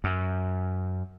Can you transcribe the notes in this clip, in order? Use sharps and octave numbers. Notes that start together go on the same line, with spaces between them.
F#2